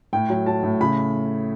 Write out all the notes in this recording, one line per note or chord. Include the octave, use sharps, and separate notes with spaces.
A2 G5
F#3
F#3 A5
A2
C#3 B5